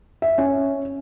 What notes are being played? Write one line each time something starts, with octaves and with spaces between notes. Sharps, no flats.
E5
C#4